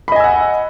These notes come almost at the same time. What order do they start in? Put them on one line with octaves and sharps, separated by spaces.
B5 D#5 G#5 E6 F#5